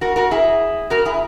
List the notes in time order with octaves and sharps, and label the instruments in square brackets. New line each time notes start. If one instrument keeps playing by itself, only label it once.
[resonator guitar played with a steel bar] F#4 A#4
F#4 A#4
E4 G#4
F#4 A#4
E4 G#4